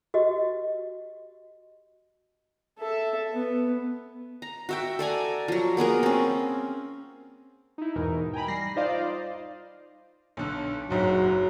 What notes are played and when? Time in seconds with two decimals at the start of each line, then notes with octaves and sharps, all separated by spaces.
0.14 F#4 G4 D#5
2.79 A4 E5
3.33 B3
4.42 A#5
4.69 F#4 E5 G5
4.99 A4 D5 G#5 A#5
5.48 F3 F#3
5.77 A#3 B3 G#4 A#4
6.03 C4 C#4
7.78 D#4 E4
7.95 E2 G#2 B2 E3 D#4 A#4
8.33 G5 G#5 A#5 B5
8.48 G3 A#6 C7
8.76 D#4 F4 C5 D5 D#5 F5
10.37 B1 D3
10.90 F#1 G#2 F#3